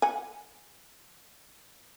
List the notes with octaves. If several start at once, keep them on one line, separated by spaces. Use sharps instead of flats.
F#5 G#5